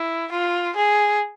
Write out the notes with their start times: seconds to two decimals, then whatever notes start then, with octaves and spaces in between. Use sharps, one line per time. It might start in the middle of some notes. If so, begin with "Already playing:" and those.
Already playing: E4
0.32 F4
0.77 G#4